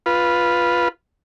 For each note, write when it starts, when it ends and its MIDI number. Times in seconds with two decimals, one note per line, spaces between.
0.06 0.88 65
0.06 0.88 71